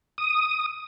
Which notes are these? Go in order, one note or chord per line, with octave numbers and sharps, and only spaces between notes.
D#6